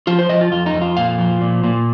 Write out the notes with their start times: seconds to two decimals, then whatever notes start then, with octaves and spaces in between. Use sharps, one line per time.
0.07 F3 F4
0.19 C5
0.29 F3 D#5
0.41 F4
0.52 F2 F4
0.66 D#4
0.74 F2
0.82 F4
0.97 A#2 F5
1.18 F3
1.41 A#2
1.64 A#2